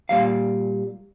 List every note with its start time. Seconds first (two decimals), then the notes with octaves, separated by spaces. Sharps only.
0.09 A#2 G3 F5